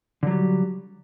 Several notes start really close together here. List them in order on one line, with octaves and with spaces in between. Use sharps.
D3 F#3 G3